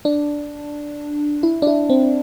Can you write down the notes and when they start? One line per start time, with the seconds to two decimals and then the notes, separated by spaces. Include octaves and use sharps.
0.05 D4
1.43 E4
1.62 D4
1.67 E4
1.90 C4